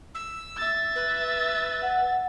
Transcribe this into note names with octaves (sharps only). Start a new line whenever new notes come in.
E6
E5 A6
B4
F#5